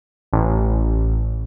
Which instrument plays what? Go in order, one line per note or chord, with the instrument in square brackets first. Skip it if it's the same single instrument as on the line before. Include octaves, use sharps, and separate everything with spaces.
[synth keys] A1